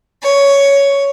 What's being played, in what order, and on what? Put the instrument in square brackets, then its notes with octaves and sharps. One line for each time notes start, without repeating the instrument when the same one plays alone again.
[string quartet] C#5